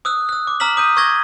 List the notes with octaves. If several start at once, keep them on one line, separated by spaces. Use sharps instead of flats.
D#6 E6 F#6
E6 F#6
D6
A#5 E6 F6 B6 F#7
D#6 G6 D#7
C#6 E6 G#6 A#6 G7